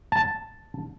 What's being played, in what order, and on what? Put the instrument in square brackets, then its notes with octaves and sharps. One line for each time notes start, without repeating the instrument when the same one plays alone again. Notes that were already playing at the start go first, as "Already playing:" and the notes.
[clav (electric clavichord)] A5